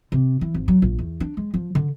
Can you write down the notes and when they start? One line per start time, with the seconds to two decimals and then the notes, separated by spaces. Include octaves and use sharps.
0.12 C3
0.41 E3
0.54 G#1
0.68 F#3
0.82 A#1
0.99 E2
1.20 D4
1.37 G#3
1.54 F3
1.75 D3